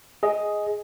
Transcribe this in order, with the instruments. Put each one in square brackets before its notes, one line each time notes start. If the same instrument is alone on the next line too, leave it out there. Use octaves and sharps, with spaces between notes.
[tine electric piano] G#4 D#5